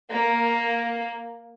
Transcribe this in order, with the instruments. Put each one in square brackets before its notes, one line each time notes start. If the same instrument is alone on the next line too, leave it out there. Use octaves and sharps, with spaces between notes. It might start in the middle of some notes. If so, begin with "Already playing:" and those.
[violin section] A#3